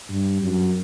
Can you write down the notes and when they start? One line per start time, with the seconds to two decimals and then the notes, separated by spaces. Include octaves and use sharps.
0.09 G2
0.42 F#2